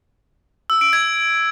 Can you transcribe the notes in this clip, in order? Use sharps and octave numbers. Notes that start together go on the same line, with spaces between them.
E6
D7
G#6